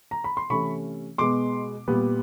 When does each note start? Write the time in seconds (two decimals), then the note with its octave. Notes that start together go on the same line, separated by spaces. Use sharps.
0.11 A#5
0.24 B5
0.37 C6
0.50 C3 E3 A3 C#4 B5 C#6
1.18 B2 G#3 B3 C6 D6
1.88 A#2 G3 B3